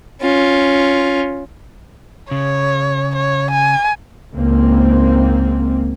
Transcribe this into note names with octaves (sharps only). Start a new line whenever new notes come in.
C#4 F4
C#3 C#5
C#5
G#5
C#2 G#2 A#3 C4